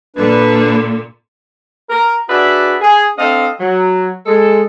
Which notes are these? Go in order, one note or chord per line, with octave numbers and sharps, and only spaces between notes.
A#2 D3 D4 B4
A#4
D4 F#4 G#4 B4 D5 E5
G#4
C4 D4 A4 D#5 F5
F#3
G#3 A4